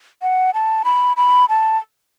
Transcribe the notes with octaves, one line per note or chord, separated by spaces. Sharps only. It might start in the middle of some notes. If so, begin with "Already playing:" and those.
F#5
A5
B5
B5
A5